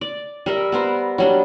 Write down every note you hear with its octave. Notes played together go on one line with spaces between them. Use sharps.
D5
G3 A#4 E5
B3 A#4 C5
F#3 G3 D4